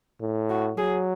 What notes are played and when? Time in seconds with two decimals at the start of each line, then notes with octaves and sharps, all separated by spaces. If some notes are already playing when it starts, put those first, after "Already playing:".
0.21 A2
0.49 F#4
0.78 F#3 G#4